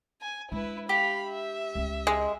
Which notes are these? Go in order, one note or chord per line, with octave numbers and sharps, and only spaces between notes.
G#5
G#3 D4 E4 B4
G4 F5 B5
E5
C#2 C#4
G#3